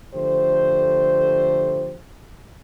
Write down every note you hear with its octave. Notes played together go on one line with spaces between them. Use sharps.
D3 F3 A3 G4 C5